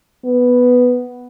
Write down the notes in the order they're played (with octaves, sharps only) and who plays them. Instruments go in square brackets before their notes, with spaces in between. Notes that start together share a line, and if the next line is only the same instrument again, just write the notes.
[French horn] B3